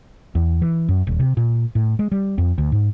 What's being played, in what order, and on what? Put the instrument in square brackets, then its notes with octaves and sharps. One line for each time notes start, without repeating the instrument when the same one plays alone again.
[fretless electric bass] E2
E3
F#2
D#1
C3
A#2
A2
G#3
G3
F2
D2
G#2